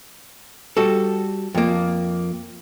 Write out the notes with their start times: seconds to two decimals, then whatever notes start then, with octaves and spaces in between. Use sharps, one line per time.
0.77 G3 F#4 A4
1.55 F2 A#3